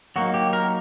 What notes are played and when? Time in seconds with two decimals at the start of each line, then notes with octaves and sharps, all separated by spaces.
0.16 F#3 A#3 D#4 F#4
0.34 G4
0.53 A#4